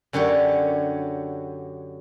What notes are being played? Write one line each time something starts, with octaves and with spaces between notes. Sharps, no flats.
F#2 D3 F#3 G4 C#5